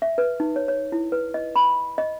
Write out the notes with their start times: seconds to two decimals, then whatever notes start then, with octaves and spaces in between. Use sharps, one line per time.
0.02 E5
0.18 B4
0.40 D#4
0.56 C#5
0.68 C#5
0.92 E4
1.12 B4
1.34 D#5
1.56 B5
1.98 D#5